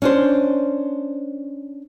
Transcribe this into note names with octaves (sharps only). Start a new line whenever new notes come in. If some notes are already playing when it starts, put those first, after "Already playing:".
C#4 D4 C5